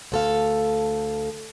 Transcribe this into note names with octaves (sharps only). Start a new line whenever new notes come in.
D2 A4 F5